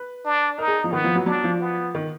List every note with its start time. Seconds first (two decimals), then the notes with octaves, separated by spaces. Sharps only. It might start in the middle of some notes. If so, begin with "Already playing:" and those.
Already playing: B4
0.25 D4
0.58 D#4 A#4
0.68 G#4
0.84 F3
0.92 D#3 B3
1.04 F3
1.15 F#3
1.26 F#3 D4
1.44 F3
1.61 B3
1.95 D#3